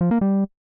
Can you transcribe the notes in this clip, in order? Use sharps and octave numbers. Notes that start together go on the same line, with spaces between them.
F3
A#3
G3